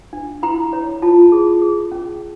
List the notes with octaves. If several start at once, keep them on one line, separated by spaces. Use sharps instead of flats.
D4
E4 A#5
C#5
F4 A5
G#4
G#4
C#4